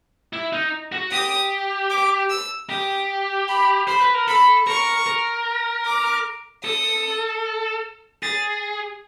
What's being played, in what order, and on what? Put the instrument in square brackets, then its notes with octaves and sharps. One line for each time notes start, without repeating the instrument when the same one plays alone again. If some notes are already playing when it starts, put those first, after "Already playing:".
[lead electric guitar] E4
D#4
F#4
[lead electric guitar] G4 [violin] D#6
[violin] D6
E6
[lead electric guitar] G4 [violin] D#6
[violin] B5
[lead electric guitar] C5 [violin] B5
[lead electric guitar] B4
A#4
[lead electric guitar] A4 [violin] B5
[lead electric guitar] A#4 [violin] C#6
[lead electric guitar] A#4
[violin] D6
[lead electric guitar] A4 [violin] D#6
[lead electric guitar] G#4 [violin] A6